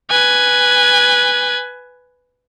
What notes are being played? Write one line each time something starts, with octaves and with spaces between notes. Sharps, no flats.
B4 G#5